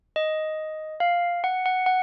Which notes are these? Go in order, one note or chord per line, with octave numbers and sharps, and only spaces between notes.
D#5
F5
F#5
F#5
F#5